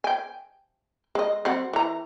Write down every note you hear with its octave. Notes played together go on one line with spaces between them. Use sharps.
G5 G#5
G#3 D#5
F#3 C4 F#5
E3 A#5